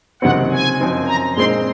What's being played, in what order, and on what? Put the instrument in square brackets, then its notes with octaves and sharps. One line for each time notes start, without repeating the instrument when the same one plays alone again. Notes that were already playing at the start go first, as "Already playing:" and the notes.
[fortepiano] C#2 C3 D#3 F#3 C4 [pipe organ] F#5
[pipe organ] G#5
[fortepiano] F#2 F3 C4 D#4
[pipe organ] A#5
[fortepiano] A#2 G#3 C4 D#4 [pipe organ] C6